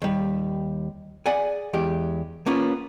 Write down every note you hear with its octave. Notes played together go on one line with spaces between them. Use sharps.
D#2 G3
G#4 D5 F#5 G#5
E2 G#3 G4
A#3 B3 C#4 F4